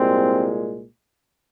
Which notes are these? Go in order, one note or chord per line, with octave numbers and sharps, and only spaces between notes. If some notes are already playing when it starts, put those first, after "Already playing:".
Already playing: C2 A#2 G#3 C4